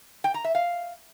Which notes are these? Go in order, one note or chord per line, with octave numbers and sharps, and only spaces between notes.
G5
A#5
E5
F5